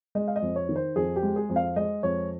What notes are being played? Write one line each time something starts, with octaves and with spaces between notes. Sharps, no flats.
G#3 D#5
F5
D#5
F2
C#5
D#3
C5
F2 G#4
G4
G#3
G#4
F2
F5
G#3 D#5
F2 C#5